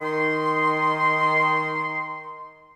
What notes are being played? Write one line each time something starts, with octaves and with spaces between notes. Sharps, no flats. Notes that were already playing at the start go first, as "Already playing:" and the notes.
D#3 C6